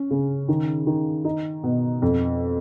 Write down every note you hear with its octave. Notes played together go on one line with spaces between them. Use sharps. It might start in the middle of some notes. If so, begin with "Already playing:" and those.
Already playing: C#4
C#3
D#3
D#3
D#4
B2
F2